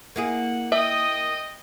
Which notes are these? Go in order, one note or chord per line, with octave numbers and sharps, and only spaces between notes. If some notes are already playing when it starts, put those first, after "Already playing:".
A#3 E4 G#4 F#5
D#5 E5 G5 D#6